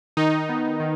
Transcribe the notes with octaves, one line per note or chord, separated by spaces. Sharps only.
D#3 D#4
B3
D#3